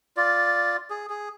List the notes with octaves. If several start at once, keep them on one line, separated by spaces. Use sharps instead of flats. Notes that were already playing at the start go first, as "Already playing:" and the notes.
F4 D5
G#4
G#4